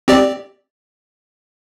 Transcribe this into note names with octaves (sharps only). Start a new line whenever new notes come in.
C4 G4 D5